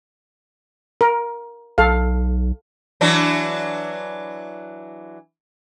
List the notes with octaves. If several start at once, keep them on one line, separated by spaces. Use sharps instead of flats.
A#4
B1 A4 F5
E3 F#3 D4